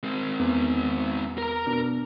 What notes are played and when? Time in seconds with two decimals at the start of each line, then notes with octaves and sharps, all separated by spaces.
0.03 G#3 C4
0.39 E2
1.38 A#4 A#5
1.66 B2 D4